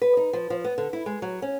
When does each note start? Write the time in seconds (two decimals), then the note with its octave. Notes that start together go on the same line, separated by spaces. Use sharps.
0.02 B4
0.17 D#4
0.33 F3
0.50 F3
0.64 B3
0.78 D3
0.93 E4
1.06 G#3
1.22 F#3
1.42 C#4